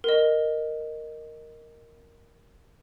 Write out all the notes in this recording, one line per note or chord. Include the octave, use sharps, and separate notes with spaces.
A#4 D#5